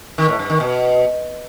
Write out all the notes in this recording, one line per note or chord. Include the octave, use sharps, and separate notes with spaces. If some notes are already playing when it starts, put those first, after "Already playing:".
D#3
A2
G2
D#3
B2